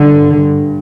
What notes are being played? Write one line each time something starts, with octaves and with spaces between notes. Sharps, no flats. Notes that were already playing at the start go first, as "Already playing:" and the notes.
Already playing: G2 D3
G2